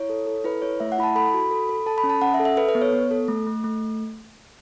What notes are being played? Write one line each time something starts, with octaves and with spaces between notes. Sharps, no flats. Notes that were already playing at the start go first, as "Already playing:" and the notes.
Already playing: E4 C#5
A4
A4
E4 B4
E4 C#5
A3 E5
F#5
E4 B5
A5
A4 B5
F#4
A4
A4
A4 A5
B5
C#4
A5
C#4 F#5
E5
A4
E5
A4 B4
B4
B3
C#5
B3
A4
A3
A3
A3